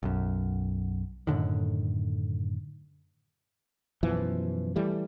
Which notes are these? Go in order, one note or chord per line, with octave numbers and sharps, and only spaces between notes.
B1 F#2
F#2 A2 D3 D#3
F#2 B2 E3 F3
E3 G3 A3